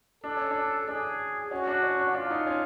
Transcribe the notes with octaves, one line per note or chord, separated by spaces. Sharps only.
D4 A4
C#4
D4
D4 G#4
C#4 F#4
D4
C#4
D4
D4 F4
D#4
C#4